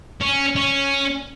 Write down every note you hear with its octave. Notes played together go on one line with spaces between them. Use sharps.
C#4
C#4